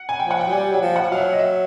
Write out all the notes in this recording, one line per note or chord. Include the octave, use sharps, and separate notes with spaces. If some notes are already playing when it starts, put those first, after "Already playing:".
Already playing: F#5
G#5
F3 G5
F#5
G5
F#3
G3 G#5
F#3 G5
F3
F#5
F3
F#3 F5
E5
D#5
E5